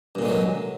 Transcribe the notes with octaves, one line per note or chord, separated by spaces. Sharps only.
G2 A#2 D3 F#3 G#3